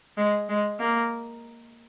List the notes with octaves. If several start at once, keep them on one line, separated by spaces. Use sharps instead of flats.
G#3
G#3
A#3